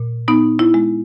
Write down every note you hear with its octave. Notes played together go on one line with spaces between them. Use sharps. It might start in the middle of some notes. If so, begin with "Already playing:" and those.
Already playing: A#2
B3 D#4
E4
G#3